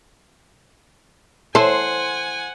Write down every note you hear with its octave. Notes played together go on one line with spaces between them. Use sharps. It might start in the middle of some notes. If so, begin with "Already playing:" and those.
E3 A4 C5 F#5 G#5